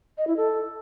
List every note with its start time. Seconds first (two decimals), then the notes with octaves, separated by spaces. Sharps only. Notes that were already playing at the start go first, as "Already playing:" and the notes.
0.18 D#5
0.27 E4
0.37 A4